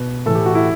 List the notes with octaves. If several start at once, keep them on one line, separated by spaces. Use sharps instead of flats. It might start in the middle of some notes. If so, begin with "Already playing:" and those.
Already playing: B2 B4
A2 E3 A4
G4
F#4
E4